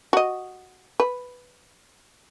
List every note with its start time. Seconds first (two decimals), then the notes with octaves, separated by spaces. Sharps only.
0.13 F#4 D#5
1.00 B4